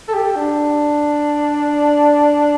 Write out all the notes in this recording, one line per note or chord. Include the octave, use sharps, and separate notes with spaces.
A4
G4
D4